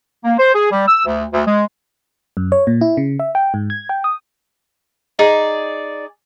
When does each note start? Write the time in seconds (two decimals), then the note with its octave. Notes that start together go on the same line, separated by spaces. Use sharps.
0.24 A#3
0.38 C5
0.55 G#4
0.72 G3
0.88 E6
1.06 D2
1.33 D2
1.47 G#3
2.37 F#2
2.52 C#5
2.67 A#2
2.81 E4
2.97 C#3
3.19 E5
3.35 G5
3.54 G#2
3.70 G#6
3.89 G5
4.04 D#6
5.19 D#4 G#4 D5